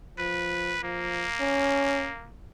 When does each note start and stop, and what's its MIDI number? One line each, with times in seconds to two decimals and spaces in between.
0.19 0.77 53
0.19 0.83 71
0.83 1.27 53
0.83 2.30 58
1.40 2.12 61